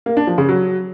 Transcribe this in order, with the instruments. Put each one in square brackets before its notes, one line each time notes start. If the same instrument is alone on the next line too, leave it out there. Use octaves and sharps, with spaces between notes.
[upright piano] A#3
D4
F3
C#3
F#3